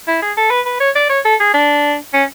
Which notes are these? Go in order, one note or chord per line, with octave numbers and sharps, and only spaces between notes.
E4
G#4
A4
B4
B4
C#5
D5
C#5
A4
G#4
D4
C#4